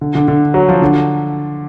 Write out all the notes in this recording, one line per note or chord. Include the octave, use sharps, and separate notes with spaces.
D3
D3
D3
F#3
F3
D3